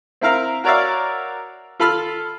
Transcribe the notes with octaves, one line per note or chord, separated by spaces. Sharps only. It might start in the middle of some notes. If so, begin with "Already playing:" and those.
C4 E4 A#4 F5 A#5
F#4 A#4 C#5 D5 E5 F5
F4 A4 B5 E6 F6